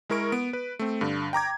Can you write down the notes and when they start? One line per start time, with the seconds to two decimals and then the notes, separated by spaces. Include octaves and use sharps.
0.10 G#3 E4 A#4 C#6 D7
0.32 B3 D7
0.53 B4
0.79 A3 C4
1.01 G2 D3
1.33 G5 A#5 D6 G#6